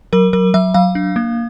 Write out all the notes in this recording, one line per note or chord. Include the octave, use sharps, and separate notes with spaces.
F#3 A#4
F#3 A#4
F#3 E5
F#3 F5
D4
A#3